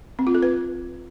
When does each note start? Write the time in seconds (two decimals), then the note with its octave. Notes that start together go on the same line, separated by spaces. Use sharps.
0.19 C4
0.27 F4
0.35 A4
0.42 B4